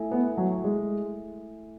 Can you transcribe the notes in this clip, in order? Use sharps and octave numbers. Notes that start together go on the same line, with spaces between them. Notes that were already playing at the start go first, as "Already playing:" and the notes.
Already playing: A3 E4 A4 E5 G#5
B3
F#3
G#3